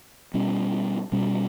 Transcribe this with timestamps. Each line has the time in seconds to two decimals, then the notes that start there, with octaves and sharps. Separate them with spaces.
0.34 B2 G3 C#4
1.12 B2 G3 C#4